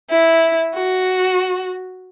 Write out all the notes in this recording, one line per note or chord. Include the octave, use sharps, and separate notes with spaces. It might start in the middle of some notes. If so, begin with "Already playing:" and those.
E4
F#4